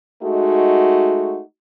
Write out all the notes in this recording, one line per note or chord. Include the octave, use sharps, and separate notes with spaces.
G#3 A3 D#4 F#4